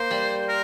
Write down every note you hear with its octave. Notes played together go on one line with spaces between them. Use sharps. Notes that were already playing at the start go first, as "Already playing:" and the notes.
Already playing: A#3 C5
G3
A#4